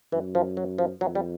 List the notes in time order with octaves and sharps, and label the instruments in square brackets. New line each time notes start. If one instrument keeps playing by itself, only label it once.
[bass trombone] F#2 [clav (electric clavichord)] E3
[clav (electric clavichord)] F3
F#3
F3
[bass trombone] F2 [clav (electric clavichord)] F#3
[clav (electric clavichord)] G3